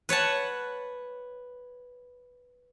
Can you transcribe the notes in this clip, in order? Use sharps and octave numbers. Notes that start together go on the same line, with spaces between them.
B4 C#5 F#5 A5